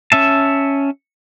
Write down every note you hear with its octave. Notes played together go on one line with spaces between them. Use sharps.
C#4 E5 A5